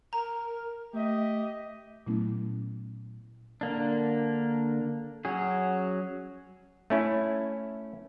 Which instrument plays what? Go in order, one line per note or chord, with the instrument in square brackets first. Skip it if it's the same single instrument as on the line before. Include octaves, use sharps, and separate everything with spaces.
[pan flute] A#4 [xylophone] A#5
[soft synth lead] A3 [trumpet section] G4 D#5 [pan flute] E5
[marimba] A#2 F#3 A3 B3 C#4 E4
[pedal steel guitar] D3 A#3 D4
F#3 C#4 F#4 G#4
[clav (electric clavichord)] A3 C#4 E4